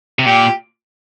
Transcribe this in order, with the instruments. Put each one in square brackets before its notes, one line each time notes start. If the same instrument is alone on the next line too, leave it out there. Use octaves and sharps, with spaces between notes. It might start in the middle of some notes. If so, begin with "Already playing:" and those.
[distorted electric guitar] C3
[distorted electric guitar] A#2 [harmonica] G4